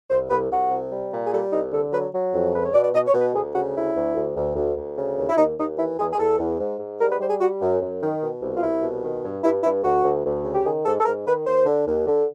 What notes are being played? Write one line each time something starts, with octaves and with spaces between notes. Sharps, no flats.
C2 C5
C2 B4
C2 F#4
C3
G3
A#2
G#4
G3 A4
C2 D#4
D3 A4
F#3 B4
F#3
F2
C#2 B4
C#5
B2 D5
D5
B2 D#5
C#5
B2
B4
D2 G#4
C#3 F#4
D2 E4
D2
D2
D2
D2
D2
C#3
D#2
E4
D#2 D#4
D#2 D#4
E3 E4
E2 G#4
G#4
E2 A4
E2
G#2
G#2
G3 A#4
B4
G3 C5
G#4
G3 F#4
F#2
F#2
D#3
B2
C2
F4
C2 E4
B2
D#3
G2
G2 E4
G2 E4
D2 F#4
D2
D2
C#3
G4
D#3 G#4
G#2 A4
A4
G#2 A#4
D#3 B4
D#2 C5
D3
D#2
D3